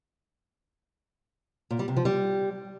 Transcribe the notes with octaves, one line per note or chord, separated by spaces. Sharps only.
A#2
G3
C3
F3
G3